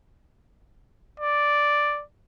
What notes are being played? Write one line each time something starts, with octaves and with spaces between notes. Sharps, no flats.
D5